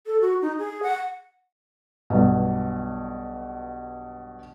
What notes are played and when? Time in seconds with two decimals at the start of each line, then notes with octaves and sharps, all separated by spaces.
0.07 A4
0.21 F#4
0.42 D#4
0.58 G#4
0.83 F#5
2.10 B1 G2 B2